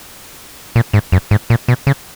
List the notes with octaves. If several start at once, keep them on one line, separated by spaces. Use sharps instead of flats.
A#2
G#2
F#2
G#2
A#2
B2
C#3